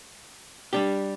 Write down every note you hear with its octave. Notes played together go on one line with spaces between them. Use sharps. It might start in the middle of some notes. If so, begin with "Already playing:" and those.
G3 D4 G4